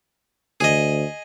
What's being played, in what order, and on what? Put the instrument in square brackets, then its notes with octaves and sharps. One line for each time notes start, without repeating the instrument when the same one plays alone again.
[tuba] D2 [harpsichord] G#4 D#5